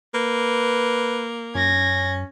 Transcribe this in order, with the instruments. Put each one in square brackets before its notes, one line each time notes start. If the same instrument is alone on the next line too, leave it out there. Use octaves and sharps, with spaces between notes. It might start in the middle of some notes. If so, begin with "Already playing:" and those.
[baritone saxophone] A#3 [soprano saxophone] B4
[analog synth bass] F#2 [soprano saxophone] C#4 [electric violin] G#6 A#6